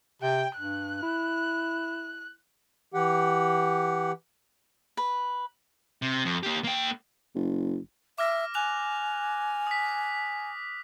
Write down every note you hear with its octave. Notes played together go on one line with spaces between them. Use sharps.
C3 G5
G2 F#6
E4
E3 G4 F#5
B4
C3
F2
A#3 G4
A#3 G5
F#1
E5 D6 F6 A#6
G#5 F#6 F7
D#6 B6